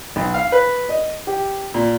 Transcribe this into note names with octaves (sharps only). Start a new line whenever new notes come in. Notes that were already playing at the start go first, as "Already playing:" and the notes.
B1
F5
B4
D#5
G4
A#2